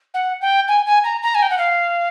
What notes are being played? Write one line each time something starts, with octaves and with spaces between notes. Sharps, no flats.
F#5
G5
G#5
G#5
A#5
A#5
G#5
G5
F#5
F5